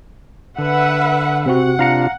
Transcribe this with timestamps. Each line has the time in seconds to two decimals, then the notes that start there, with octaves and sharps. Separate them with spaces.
0.58 D3 B4 E5 F#5
1.46 C3 C4 F#4 F#5
1.79 C3 D4 F4 F5 A#5 C#7